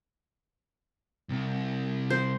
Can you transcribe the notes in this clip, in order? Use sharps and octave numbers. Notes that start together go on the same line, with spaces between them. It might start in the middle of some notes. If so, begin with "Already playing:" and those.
C2
C5